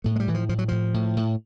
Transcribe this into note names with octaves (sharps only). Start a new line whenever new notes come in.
A2 A3
G#3
G3
A2 E3
F3
A2 F3
F#3
A2 F3
A2
A2